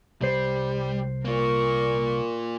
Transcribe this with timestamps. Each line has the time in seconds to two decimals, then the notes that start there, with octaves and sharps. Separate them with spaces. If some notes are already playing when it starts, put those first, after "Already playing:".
0.22 C2 G3 C5
1.25 A#3 F4 A#4 C#6